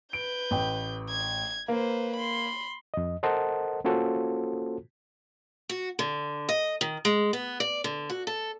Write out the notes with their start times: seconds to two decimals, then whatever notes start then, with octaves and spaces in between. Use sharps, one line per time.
0.13 B4 G6 D7
0.51 A1 G5
1.10 G#6
1.68 A#3 B4 C5
2.16 B5 C6
2.94 F2 D#5
3.23 A4 A#4 C5 D#5 F#5 A5
3.84 A#3 C#4 F4 F#4 A4 C5
5.69 F#4
5.99 D3
6.49 D#5
6.81 D#3
7.05 G#3
7.33 B3
7.60 D5
7.84 D3
8.10 F#4
8.27 A4